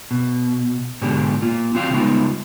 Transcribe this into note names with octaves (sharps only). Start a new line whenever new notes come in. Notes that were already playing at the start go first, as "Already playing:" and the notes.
B2
G#2 B2 D3 F#3 G4
A#3 F4
C4 F#4 F5 G5
C#3 G3 G#3 B3 D#4 F4